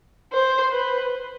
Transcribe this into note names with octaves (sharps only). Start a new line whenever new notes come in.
C5
B4